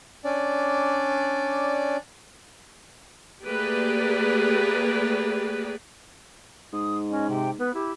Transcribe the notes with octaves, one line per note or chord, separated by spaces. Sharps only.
C#4 D4 D5
A3 A#3 G4 G#4 B4 D5
G#2 D#6
C#4 D#5
C3 G5
B3 B4
E4 G4